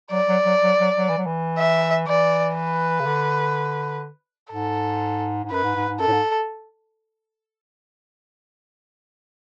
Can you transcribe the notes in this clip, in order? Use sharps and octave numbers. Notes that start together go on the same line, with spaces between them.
F#3 D5
F#3
F#3
F#3
F#3
F#3
E3
F#3
E3
E5
E3 D5
B4
C#3
D3
G#2 A4
G#2
F#2 B4
G#2
G#2
G#2
F#2 A4
A2
G#2